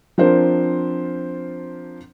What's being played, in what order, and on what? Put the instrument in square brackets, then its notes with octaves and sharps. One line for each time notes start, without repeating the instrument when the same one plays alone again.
[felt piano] F3 C4 D4 F4 A#4 C5